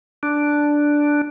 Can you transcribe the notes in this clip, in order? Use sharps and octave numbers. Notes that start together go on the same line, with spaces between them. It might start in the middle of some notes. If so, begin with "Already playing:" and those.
D4